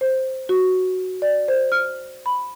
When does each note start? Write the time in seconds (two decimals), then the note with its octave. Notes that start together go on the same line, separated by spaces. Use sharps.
0.01 C5
0.49 F#4
1.22 D5
1.48 C5
1.72 F6
2.26 B5